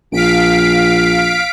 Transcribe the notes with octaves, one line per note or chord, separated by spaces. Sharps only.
A#1 F5 B6 D7